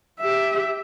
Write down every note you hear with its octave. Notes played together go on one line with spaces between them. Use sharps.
G4 E5